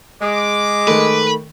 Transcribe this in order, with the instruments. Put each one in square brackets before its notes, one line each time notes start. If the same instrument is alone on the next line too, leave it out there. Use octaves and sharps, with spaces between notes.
[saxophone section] G#3 [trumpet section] D6
[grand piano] D#3 A3 [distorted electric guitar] B4